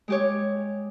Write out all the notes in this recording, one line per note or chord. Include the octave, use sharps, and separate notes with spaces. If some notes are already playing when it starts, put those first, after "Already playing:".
G#3 G4 C#5